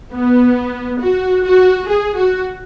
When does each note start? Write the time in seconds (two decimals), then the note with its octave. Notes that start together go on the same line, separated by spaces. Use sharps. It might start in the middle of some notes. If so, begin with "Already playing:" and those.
0.13 B3
1.01 F#4
1.44 F#4
1.88 G#4
2.17 F#4